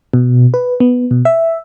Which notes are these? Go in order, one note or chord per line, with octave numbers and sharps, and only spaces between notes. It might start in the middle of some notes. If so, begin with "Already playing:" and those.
B2
B4
B3
B2
E5